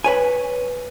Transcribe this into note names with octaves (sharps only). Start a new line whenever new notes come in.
B4 C#5 G#5